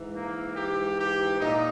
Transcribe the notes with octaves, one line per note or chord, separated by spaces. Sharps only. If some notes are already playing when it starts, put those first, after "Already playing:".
Already playing: G#2 E3
A#3
G4
G4
A#2 D#4